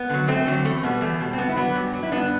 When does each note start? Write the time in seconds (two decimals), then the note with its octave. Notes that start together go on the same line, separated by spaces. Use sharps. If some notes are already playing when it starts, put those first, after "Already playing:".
Already playing: B3
0.10 D3 F#3
0.27 F#2 A3 C4
0.46 D3 F#3
0.65 E2 A3 C4
0.83 B2 G3 B3
1.01 E2 A3
1.20 B2 G3
1.33 C4
1.38 G2 B3
1.48 E4
1.56 F#3 B3 D4
1.75 G2
1.93 F#3
2.03 E4
2.12 G2 B3 D4